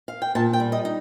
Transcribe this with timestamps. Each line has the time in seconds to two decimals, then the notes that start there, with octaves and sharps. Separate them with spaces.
0.08 F5
0.22 G5
0.35 A#2 A5
0.53 G5
0.60 G3
0.72 D#5
0.85 D#4